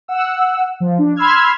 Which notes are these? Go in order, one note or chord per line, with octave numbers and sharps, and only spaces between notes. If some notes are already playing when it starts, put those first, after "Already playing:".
F#5 E6
F3
D4
B5 C6 E6 F6 G#6